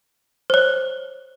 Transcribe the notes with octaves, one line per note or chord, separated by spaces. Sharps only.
C5
C#5